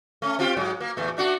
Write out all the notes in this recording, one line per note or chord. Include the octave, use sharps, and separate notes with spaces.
A3 C#4
C4 F4 G4
G#2 F#3 G#3
A#3
E2 A#2 A3
A3 D4 F#4